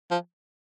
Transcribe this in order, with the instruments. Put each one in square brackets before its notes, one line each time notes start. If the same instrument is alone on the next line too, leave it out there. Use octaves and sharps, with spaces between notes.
[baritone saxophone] F3